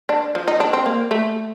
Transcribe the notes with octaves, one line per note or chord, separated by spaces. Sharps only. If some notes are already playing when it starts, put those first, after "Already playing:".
D4
F3
D#4
D4
C4
A#3
A3